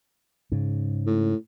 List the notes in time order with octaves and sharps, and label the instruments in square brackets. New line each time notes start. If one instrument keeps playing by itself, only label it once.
[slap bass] G#2 C#3
[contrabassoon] A2